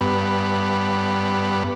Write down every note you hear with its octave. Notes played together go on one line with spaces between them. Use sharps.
G2 B3